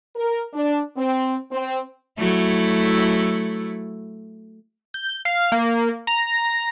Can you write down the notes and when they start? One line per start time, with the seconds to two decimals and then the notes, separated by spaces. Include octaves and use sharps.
0.16 A#4
0.53 D4
0.97 C4
1.52 C4
2.18 F#3 A3 E4
4.94 G6
5.25 F5
5.52 A#3
6.07 A#5